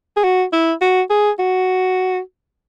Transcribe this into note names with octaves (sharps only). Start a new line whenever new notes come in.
G#4
F#4
E4
F#4
G#4
F#4